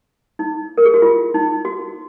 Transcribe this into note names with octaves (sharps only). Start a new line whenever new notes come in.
D#4
A#4
G#4
F#4
F4
D#4
F#4